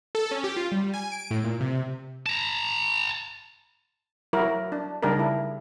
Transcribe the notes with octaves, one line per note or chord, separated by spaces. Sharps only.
A4
C#4
G4
F4
G3
G#5
D7
A2
A#2
C3
A5 A#5
F#3 E4 F#4 A#4
D4
C#3 G3 D4 D#4 A#4
E4